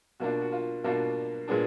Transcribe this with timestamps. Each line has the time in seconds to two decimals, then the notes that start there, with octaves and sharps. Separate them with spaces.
0.20 B2 A#3 D4 F4 F#4
0.41 F#4
0.52 F4
0.84 B2 A#3 D4 F4 F#4
1.48 A#2 G#3 B3 D4 G#4